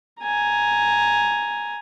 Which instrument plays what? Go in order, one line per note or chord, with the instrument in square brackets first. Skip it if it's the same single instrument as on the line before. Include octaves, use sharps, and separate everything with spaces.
[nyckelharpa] G#5 A#5